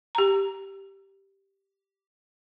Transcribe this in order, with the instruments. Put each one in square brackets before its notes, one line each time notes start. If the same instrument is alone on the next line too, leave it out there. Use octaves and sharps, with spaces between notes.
[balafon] G4 A#5